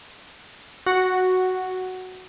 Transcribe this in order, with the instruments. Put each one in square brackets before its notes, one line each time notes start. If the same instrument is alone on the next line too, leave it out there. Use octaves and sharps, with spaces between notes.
[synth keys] F#4